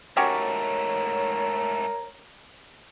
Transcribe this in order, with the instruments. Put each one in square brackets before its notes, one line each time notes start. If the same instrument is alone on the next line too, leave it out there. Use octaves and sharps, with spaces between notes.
[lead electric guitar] G#2 A3 [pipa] C#4 F#4 G4 [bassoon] A#4 [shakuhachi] C#5